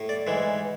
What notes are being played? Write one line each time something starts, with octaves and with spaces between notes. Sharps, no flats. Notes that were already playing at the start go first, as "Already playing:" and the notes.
Already playing: A2
D5
G#2 E3 G#3